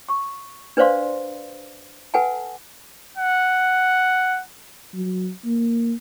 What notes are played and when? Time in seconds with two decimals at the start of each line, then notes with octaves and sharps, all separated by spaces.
0.09 C#6
0.77 D4 B4 C5 D5 F5 C6
2.14 A4 B4 F#5 G#5 A5
3.18 F#5
4.94 F#3
5.46 A#3